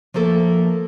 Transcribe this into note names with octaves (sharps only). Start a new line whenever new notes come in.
F3 A3 A#3 A4